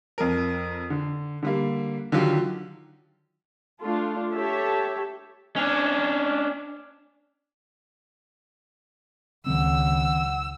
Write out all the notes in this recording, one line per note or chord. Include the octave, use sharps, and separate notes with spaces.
F2 A#4
D3
D3 G3 A#3
D3 D#3 F#3 F4 G4
A3 D4 F4 A4
G4 A4 C#5 E5 A5
C#4 D4
C#2 D#3 F#3 C4 F#5 E6